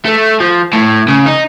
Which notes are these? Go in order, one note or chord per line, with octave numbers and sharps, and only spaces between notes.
A3
F3
A2
C#3
D#4